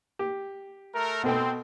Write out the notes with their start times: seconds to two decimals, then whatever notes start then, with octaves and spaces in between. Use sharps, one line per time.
0.19 G4
0.94 A3 A#4
1.23 B2 C4 A4 G5